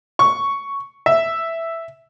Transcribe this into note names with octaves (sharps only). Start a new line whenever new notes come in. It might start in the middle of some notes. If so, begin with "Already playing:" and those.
C#6
E5